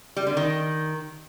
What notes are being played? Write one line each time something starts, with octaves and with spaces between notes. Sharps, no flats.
G3
D3
D#3